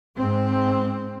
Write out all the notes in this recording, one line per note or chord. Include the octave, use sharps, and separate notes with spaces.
G#2 C4